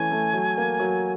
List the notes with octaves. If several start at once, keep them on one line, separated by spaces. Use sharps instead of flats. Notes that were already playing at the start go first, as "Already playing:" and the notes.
Already playing: E3 A3 C#4 G#5
A3
F#3
A#3
F#3